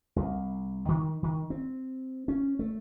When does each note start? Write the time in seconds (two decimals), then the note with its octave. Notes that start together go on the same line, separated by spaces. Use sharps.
0.16 C2
0.88 D#3
1.23 D#3
1.50 C4
2.28 C#4
2.59 A3